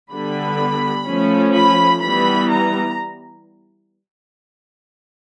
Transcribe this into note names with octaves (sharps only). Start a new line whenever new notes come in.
D3 G3 B3 B5
F3 A3 C#4
B5
E3 G3 B3 B5
A#5